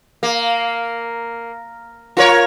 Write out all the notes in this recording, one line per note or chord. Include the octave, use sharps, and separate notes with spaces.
A#3
F4 A#4 C#5